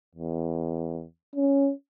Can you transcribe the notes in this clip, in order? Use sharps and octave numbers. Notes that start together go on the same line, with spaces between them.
E2
C#4